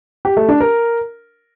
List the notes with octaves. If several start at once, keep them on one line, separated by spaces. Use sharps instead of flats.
G4
A3
D4
A#4